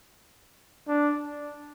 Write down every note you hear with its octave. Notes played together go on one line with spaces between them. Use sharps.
D4